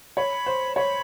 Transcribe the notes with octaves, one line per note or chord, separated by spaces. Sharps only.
C#5 B5
C5
C#5 B5